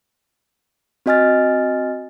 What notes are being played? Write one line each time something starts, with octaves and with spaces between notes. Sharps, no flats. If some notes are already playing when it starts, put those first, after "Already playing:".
C4 F#4 D#5 G#5 F6 A6